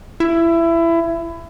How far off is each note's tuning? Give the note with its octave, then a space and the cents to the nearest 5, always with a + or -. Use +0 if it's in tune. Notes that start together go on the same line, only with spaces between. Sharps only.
E4 +20